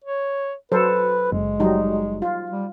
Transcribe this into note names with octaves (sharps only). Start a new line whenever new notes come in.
C#5
F#3 A4 B4 C5
F#1 G#3
F#3 G3 D#4
F4
G3